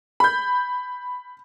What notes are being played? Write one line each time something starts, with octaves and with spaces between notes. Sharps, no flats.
B5 G6